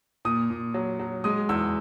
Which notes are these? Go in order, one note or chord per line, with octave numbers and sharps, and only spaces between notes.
A#2 D#6
A#2
F#3
F#3
G#3 D#6
E2 E6